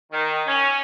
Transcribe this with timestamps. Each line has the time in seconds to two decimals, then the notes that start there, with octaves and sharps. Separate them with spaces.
0.12 D#3
0.46 C#4